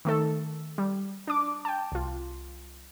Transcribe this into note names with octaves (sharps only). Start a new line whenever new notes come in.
D#3 A3 A4
G3
D4 D6
G5 A5
C2 F4